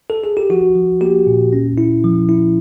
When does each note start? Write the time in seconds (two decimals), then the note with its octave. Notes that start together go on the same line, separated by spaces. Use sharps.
0.10 A4
0.24 G#4
0.37 G4
0.50 F3 F#4
0.75 F3
1.01 A#3 G4
1.27 A#2
1.53 C#4
1.78 E4
2.04 F3
2.29 E4